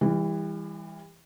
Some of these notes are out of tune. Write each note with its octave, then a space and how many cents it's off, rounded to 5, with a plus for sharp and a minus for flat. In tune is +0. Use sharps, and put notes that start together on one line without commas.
E3 +0 G3 +40